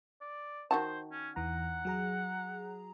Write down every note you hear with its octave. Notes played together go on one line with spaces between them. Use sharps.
D5
D#3 F#4 C5 A5
C#4
E2 E3 F#5 A#5
F#3 G#4 A#5